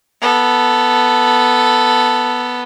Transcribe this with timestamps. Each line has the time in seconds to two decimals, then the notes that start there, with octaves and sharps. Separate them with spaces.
0.21 B3 A4